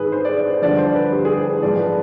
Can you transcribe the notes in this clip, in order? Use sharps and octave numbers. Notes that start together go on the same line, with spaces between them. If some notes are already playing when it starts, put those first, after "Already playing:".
Already playing: G#2 D#3 G#4 B4
C5
D5
D5
C5
G2 D3 F3 D5
C5
B4
G4
G#4
C5
D5
G#2 F3 D5
B4